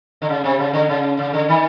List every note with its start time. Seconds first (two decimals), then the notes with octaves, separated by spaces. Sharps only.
0.22 D3
0.29 C#3
0.44 C3
0.59 C#3
0.73 D3
0.89 C#3
1.19 C#3
1.33 D3
1.49 D#3